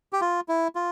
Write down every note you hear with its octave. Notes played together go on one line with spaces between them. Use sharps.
G4
F4
E4
F4